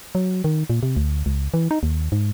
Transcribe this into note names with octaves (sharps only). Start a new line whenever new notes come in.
F#3
D#3
A#2
C3
D2
C#2
E3
D#4
D#2
G#2